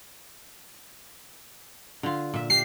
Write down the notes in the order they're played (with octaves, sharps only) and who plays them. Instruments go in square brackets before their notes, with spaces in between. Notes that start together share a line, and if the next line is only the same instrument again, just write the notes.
[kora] D3 F4
A#2 E5
[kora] D4 G4 [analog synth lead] C7